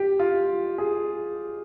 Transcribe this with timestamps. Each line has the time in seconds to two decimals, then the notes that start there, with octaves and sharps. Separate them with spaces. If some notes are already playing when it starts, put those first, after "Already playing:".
Already playing: G4
0.19 F4
0.78 G#4